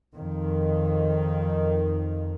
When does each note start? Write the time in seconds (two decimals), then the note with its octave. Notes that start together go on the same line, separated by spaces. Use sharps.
0.15 F2 D#3